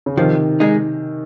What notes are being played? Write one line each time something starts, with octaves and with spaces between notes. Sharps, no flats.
C#3
C3 D#3 F3
G#3 D#4 G#4